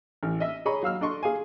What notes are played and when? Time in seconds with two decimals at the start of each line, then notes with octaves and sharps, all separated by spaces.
0.23 A1
0.40 D#5 E5
0.66 G#4 C#5 D#5 A#5 B5 C#6
0.83 F#3 F5 E6 F6
1.01 D4 A4 D#5 C6 C#6
1.23 G#4 F5 G#5